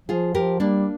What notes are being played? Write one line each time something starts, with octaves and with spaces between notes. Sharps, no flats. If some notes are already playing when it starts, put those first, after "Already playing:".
F3 F4 G#4
F3 G4 A#4
G3 A#3 D4